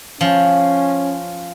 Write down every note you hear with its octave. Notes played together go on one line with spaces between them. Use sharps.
F3 C#4